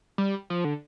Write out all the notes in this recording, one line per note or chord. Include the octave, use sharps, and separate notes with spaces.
G3
F3
D3